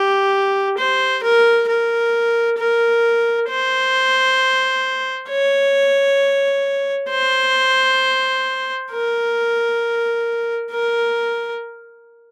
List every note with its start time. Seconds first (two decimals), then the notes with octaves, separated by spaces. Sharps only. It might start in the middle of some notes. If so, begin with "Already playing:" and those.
Already playing: G4
0.78 C5
1.23 A#4
1.68 A#4
2.58 A#4
3.49 C5
5.29 C#5
7.09 C5
8.91 A#4
10.71 A#4